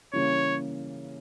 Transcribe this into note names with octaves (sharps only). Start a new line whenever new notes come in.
C#3 E3 G3 A#3 C#4 C#5